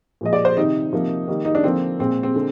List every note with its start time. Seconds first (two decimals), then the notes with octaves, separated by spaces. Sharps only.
0.21 A#2 F3 G#3 D#5
0.33 D5
0.45 C5
0.57 C3 D#3 G3 D#4
0.93 C3 F3 A#3
1.28 D#3 G3 A#3
1.45 D#4
1.55 D4
1.64 D3 F3 A#3 C4
1.99 A#2 G#3 C4
2.23 C4
2.35 D3 G#3